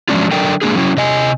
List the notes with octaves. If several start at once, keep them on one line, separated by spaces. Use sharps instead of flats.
F3 F#3 G#3 C#4 D4 F4
D3 F#3 D4 A4 A#4 G5
G#3 A#3 D4 G#4
F#3 C#4 E4
C3 D#5 G#5